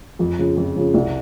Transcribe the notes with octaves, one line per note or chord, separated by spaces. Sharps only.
F2
C#3 F3
F2
C#3 F3
C2